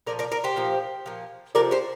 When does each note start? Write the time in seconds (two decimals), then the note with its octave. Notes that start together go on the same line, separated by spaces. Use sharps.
0.07 A#2 F3 A#4 D5
0.19 A#4 D5
0.32 A#4 D5
0.44 G4 C5
0.56 A#2 F3
1.06 A#2 F3
1.55 C3 F3 A#4 D5
1.71 G4 C5